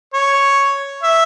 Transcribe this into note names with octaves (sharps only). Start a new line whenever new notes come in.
C#5
E5